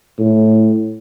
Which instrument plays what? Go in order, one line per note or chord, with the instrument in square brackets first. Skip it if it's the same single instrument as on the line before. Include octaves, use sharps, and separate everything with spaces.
[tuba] A2